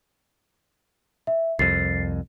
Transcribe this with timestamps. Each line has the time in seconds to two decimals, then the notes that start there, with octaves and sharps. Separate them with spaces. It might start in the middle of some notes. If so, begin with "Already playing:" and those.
1.27 E5
1.59 C2 F2 A6 C7